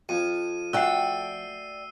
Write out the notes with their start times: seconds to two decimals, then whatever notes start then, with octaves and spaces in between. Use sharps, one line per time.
0.09 F2 D#7
0.73 A3 F#4 D5 G5 E6 C7